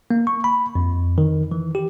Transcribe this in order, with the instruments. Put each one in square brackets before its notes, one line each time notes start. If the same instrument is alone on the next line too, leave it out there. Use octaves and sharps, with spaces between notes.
[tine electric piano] A#3
C#6
B5
F2
D#3
E3
G4